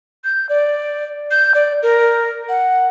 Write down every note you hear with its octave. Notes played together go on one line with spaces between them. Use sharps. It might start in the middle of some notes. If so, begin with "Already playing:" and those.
G6
D5
G6
D5
A#4
F#5